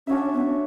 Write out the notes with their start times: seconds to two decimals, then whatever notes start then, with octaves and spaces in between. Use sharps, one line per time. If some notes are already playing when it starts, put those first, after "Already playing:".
0.07 C#4 D4 F#4 C#5 E5
0.33 B3